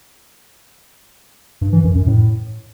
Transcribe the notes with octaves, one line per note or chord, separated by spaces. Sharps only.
G2
E3
F#2
F#2
A2